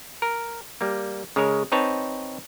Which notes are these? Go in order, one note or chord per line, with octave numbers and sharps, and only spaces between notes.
A#4
G3 A#3
C#3 G#3 A#4 C#5
C4 D#4 B4 C#5 A5